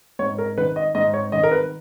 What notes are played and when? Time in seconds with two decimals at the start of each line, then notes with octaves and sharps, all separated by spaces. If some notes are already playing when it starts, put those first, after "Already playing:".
0.19 G#2 C#5
0.38 A#4
0.58 D#3 B4
0.76 D#5
0.95 G#2 D#5
1.14 C#5
1.32 D#3 D#5
1.43 A#4
1.52 B4